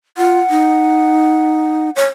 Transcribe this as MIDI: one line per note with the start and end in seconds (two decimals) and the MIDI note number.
0.18 0.39 65
0.18 1.88 78
0.50 1.90 63
1.96 2.06 73